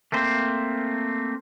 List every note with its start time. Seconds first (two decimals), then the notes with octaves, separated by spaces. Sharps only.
0.12 A3 A#3 C4 C5